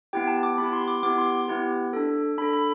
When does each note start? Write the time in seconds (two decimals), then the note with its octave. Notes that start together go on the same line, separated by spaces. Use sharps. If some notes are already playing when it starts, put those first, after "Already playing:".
0.13 B3 E4 G4 G5
0.28 A5
0.43 D6
0.58 B3 E4 G4 B5
0.73 C6
0.88 D6
1.03 B3 E4 G4 D6
1.18 C6
1.48 B3 E4 G4
1.93 D4 A4
2.38 D4 A4 B5
2.53 B5